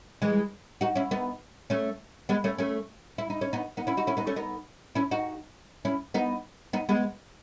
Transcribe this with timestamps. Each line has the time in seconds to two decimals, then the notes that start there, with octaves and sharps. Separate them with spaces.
0.22 E3 G#3
0.81 D#4 F#4
0.96 C#4 E4
1.11 B3 D#4
1.70 A3 C#4
2.29 G#3 B3
2.44 A3 C#4
2.58 A3 C#4
3.18 E4
3.30 D#4
3.41 C#4
3.53 B3 D#4
3.77 B3 D#4
3.87 C#4 E4
3.97 D#4 F#4
4.07 C#4 E4
4.17 B3 D#4
4.27 A3 C#4
4.36 B3 D#4
4.95 C#4 E4
5.11 D#4 F#4
5.85 C#4 E4
6.14 B3 D#4
6.73 B3 D#4
6.89 G#3 B3